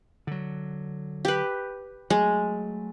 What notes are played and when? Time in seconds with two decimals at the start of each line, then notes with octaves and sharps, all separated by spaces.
0.27 D3 F#3
1.25 G4 B4
2.10 F#3 G#3 A3